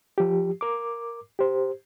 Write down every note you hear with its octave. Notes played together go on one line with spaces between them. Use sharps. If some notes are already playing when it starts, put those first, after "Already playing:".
F3 G4
A#4 D6
G4 C5